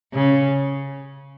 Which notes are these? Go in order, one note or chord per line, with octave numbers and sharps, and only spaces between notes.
C#3